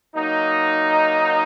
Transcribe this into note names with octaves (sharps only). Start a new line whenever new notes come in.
F#3 A#3 D#4